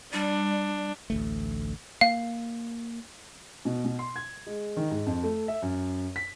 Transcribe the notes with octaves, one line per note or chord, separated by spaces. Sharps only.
G3 D4
A1 D2 A3
A#3 F5
B2
B2
C6
G#6
G#3
D#3
G#2
F2
A3
E5
F#2
B6